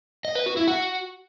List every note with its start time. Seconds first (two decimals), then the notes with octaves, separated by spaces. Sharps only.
0.25 D#5
0.35 B4
0.46 F#4
0.57 E4
0.68 F#4